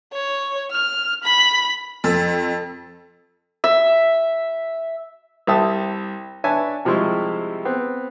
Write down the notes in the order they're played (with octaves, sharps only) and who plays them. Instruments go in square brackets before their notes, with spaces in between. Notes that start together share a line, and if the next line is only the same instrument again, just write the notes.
[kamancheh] C#5
F6
B5
[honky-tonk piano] F2 [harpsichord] A4
[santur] E5
[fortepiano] C2 G4 C5 E5 A5 D#6
D4 B4 C#5 E5 G#5 A5
C3 F3 G3 G#3 E4 C#6
B3 C4